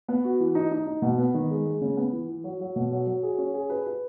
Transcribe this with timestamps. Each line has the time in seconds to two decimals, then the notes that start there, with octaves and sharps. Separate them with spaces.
0.09 B3
0.24 F#4
0.40 E3
0.55 D#4
0.72 D#4
0.87 D#4
1.02 B2
1.18 B3
1.34 D#3
1.50 G#3
1.65 G#3
1.81 C#3
1.97 B3
2.12 E3
2.28 E3
2.44 F#3
2.61 F#3
2.76 B2
2.92 F#3
3.07 F#3
3.23 G#4
3.38 C#4
3.54 G#4
3.70 B4
3.87 B4